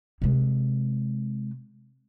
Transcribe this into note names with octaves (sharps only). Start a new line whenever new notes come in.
C3 G#3